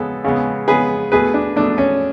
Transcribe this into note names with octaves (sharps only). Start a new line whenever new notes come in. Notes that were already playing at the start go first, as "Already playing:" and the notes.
Already playing: C#3 G#3 B3 A4
C#3 G#3 B3
C#3 G#3 B3 G#4 B4
B2 A3 G#4 B4
D4
B2 A3 D4
C#4